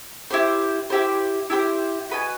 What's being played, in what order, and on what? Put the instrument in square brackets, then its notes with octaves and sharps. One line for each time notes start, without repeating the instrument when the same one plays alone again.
[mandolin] E4 G4 C5
E4 G4 C5
E4 G4 C5
F#4 B4 D#5 G#5